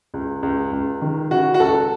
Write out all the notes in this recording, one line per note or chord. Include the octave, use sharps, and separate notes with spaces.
C#2
C#2
C#2
D#3
C#3 F#4
F#4
C#2 A4